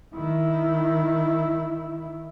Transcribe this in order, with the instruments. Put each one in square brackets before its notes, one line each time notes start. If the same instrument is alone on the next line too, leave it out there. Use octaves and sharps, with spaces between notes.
[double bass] D#3 E4